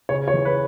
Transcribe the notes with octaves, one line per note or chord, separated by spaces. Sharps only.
C#3 C#5
C#5
E3
B4